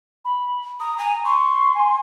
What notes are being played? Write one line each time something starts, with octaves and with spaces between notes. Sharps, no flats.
B5
A#5 D#6
G#5 A#5
C6 C#6
G#5